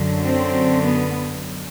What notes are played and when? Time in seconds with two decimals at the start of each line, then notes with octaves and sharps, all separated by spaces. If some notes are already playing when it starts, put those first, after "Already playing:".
Already playing: F#2 D3 F#3
0.23 C4
0.82 B3